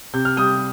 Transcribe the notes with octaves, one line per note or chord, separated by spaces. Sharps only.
C3 G6
F6
G3 D#6 G6